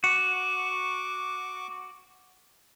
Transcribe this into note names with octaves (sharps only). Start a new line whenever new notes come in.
F#4 C#6 D6